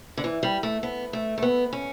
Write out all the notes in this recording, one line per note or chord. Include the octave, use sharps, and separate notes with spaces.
D3
E3
G3
A3
B3
A3
A3
B3
C#4